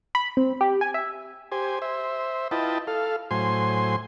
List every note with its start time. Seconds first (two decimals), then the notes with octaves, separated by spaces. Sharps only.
0.15 B5
0.37 C4
0.61 G4
0.81 G#5
0.94 E5
1.52 G4 C5 G#5
1.82 C5 E5
2.51 E4 F4 B4 D#5 G5 A5
2.87 A4 F5
3.31 A2 F#3 C5 G#5 C6